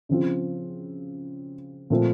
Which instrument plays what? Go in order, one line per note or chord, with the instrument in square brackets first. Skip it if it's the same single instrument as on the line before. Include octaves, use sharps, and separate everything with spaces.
[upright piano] C#3 F3 C4 F4
A#2 F3 A3 C4 F4